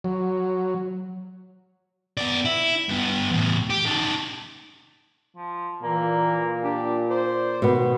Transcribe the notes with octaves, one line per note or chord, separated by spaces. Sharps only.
F#3
B3 D5
E4
G2 B3
E2 A2
G4
D#3 A4
F3
A#2 E3 A#3
D4 G4
C5 D5
B2 D#3 B3